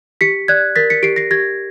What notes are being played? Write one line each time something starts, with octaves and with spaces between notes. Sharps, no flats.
G4 B6 C#7
D5 F#6 G#6
A#4 A6 B6
B6 C#7
G4 C7 D7
A#6 C7
G4 G#6 A#6